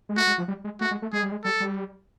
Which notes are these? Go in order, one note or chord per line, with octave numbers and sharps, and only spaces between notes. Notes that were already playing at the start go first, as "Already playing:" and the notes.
G#3
A3 F#4
G#3
F3
G3
G#3
A3 F#4
G#3
A3
G#3 G#4
G3
G#3
G3 A4
G3